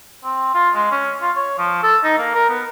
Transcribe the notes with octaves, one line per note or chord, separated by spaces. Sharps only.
C4
F4
G#3
C#4
F4
C#5
F3
A4
D#4
A#3
A#4
B3